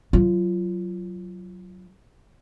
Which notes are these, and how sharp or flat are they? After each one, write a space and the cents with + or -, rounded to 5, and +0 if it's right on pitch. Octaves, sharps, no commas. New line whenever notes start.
F#3 +0 F4 -20